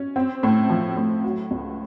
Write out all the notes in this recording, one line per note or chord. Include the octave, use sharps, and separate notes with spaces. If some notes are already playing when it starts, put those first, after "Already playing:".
Already playing: C#4
C4
A2
F3
A2
F#3
C#2